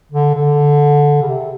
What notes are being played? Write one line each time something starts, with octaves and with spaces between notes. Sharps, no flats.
D3
D3
C#3
C3